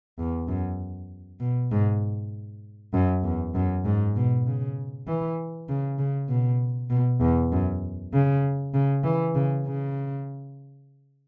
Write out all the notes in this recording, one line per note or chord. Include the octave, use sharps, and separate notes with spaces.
E2
F#2
B2
G#2
F#2
E2
F#2
G#2
B2
C#3
E3
C#3
C#3
B2
B2
E2
F#2
C#3
C#3
E3
C#3
C#3